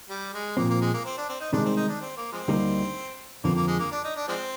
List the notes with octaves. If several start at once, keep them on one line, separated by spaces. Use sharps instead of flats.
G3
G#3
A#2 F3 A#3 C4
A#3
G#3
A#3
C4
D4
C4
D#4
C2 C3 D#3 G#3 D4
C4
D#4
D4
C4
A#3
F3 G#3 C4
D2 D3 G3 A#3 D#4
F2 D3 F3 A#3 C4
A#3
G#3
A#3
D4
D#4
D4
F3 G#3 C4